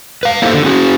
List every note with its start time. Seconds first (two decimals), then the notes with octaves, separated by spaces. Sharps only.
0.23 B4 F5
0.42 A#3 D#4 E4 G4 A4 C5
0.53 D3
0.65 C#4 F#4 G#4